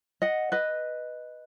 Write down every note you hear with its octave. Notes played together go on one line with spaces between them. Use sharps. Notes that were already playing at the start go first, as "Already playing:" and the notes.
D#5 F#5
B4 D#5